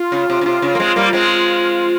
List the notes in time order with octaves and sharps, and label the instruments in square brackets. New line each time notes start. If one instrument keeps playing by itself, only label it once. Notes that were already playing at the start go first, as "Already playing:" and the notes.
Already playing: [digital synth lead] F4
[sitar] C#3
C3
C#3
[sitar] C3 [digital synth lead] F4
[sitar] C#3
A#3
G#3 C4
G3 A#3
G#3 C4